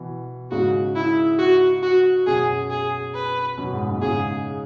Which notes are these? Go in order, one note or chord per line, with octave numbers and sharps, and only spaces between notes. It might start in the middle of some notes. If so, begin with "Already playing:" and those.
Already playing: B2 E3
G#2 C#3 F#4
E4
F#4
F#4
F#2 B2 G#4
G#4
B4
F#2 B2
G#2
F#2
G#2 C#3 G#4